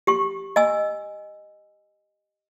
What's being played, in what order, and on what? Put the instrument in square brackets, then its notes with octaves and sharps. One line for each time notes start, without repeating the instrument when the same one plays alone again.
[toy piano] G4 C#6
D#5 G#5 E6